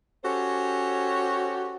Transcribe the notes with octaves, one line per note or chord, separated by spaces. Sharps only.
C#4 F#4 G4 A4 C5 C#5